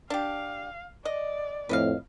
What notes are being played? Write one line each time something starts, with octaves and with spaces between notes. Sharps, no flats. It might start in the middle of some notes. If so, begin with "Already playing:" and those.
D4 G4 F5
D5 D#5
F2 A2 B4 D#5 F5